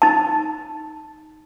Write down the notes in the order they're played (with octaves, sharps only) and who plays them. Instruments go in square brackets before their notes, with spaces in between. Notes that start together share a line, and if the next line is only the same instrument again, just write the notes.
[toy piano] D#4 A5